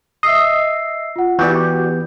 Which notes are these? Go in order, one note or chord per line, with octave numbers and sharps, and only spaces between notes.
D#5 E5 E6 C7
F4 F#5
E3 B3 F#4 G4 D5 G6